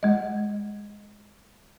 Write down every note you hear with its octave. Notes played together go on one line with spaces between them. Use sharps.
G#3 D#5